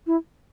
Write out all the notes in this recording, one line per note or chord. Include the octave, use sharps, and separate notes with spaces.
E4